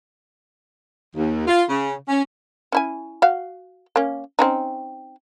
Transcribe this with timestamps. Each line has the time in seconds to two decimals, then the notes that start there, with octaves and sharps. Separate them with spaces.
1.16 D#2
1.47 F4
1.68 C#3
2.08 C#4
2.72 C#4 E4 G#5
3.22 F#4 F5
3.96 A#3 C#4
4.39 C4 C#4 D#4